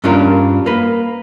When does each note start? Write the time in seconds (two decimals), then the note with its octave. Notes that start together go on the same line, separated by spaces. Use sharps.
0.04 G2 C#4 D4 F4 A#4
0.66 A#3 B4